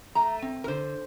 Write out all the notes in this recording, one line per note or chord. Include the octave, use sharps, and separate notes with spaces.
A3 A#5
C4
A#4
D3 C5